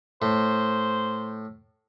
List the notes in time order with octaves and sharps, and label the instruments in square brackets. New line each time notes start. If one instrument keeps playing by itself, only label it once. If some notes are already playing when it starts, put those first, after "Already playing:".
[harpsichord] A2 [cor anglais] C5